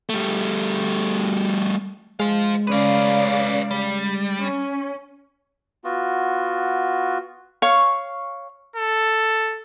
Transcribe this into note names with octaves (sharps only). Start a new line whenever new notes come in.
G3 A3
G#3 C5 F5
C#3 C#4 B4 D5 F5
G3
C#4
B3 F4 F#4
C#5 F5 C#6
A4